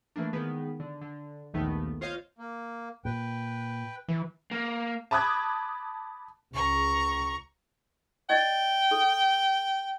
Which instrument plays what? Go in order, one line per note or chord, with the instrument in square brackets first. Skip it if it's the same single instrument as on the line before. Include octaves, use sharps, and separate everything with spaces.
[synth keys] E3 A3 A#3 D4
D#3 G#3 B3
D3
D3
A#1 D#2 D#3 A3 B3
F4 C5 C#5 D#5 F5
[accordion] A#3
[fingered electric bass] A#2 [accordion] B4 G5
[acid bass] E3
[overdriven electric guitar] A#3
[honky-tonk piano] A5 B5 D6 D#6 F#6 G#6
[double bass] C#2 [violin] A#5 C#6
[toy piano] D5 D#5 [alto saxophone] G5
[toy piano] A4